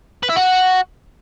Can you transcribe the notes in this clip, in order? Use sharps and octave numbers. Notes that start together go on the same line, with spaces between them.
B4
E4
F#4